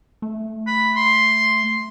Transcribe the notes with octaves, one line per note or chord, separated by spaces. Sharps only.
A3
B5
C6